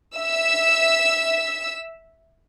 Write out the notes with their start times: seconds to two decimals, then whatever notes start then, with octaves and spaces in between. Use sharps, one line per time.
0.16 E5 E6